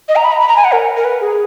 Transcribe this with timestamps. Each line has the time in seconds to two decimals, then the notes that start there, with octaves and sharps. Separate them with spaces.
0.09 D#5
0.16 A#5
0.24 B5
0.32 A#5
0.40 B5
0.49 A#5
0.57 G#5
0.64 F#5
0.72 A#4
0.97 A#4
1.05 B4
1.21 G#4